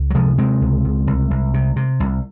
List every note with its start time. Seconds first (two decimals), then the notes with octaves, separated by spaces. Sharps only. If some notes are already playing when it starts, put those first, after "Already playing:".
Already playing: C#2
0.10 F#3
0.14 C3 F3 G#3
0.38 C3 G#3 C4
0.61 C#2
0.85 C#2
1.07 C2
1.31 C2
1.54 C3
1.76 C3
2.00 C2